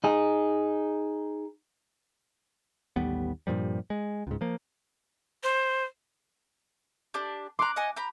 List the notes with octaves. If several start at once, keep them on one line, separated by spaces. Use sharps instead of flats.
D#4 G#4
A1 D#2 G3 B3
G2 A#2 F3 G3
G#3
C#2 G#2
F3 A#3
C5
D4 G4
A#5 C6 D6 F#6
D#5 F#5 G#5
G4 A#5 B5